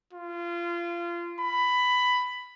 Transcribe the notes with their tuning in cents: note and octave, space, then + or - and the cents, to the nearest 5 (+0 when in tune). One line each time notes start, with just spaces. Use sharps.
F4 -25
B5 +10